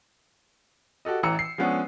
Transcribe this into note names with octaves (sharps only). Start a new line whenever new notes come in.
F#4 G4 A4 D#5
A1 E3 A#5 E6 C#7
C7
F3 G#3 B3 C#4 D4